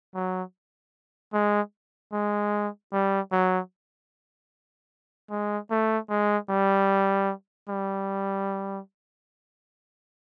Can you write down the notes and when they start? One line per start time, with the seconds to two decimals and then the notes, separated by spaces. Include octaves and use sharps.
0.15 F#3
1.33 G#3
2.13 G#3
2.93 G3
3.32 F#3
5.30 G#3
5.71 A3
6.10 G#3
6.49 G3
7.69 G3